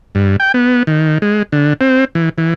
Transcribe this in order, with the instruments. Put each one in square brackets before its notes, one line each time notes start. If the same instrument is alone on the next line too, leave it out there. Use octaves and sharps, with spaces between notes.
[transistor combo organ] G2
G5
B3
D#3
G#3
D3
C4
E3
E3